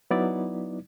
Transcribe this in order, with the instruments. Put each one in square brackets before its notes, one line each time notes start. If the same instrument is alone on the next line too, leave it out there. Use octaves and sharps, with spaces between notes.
[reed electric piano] F#3 B3 D#4 E4 D5